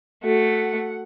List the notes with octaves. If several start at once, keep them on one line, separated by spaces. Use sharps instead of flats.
A3 F#4 A4 F#5